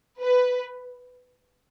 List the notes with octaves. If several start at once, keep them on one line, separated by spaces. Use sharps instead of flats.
B4